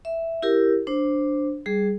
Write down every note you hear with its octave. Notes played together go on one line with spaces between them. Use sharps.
E5
E4 G4 A#4
D4 C5
G3 G#4